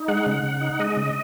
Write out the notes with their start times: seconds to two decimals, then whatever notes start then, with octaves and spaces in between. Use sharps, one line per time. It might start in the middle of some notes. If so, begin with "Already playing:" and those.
Already playing: D#4
0.08 G#3 F#5
0.26 C#3
0.43 C#3
0.61 D#4
0.79 G#3 D#5
0.97 C#3